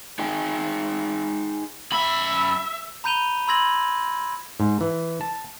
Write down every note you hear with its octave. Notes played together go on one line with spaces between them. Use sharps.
D#4 G#4 G5 G#5
F#2 E5 B5
A#5 B5 G6 D#7 F7 G7
B5 C6 E6 G#6 A#6 F#7
G#2
E3
A5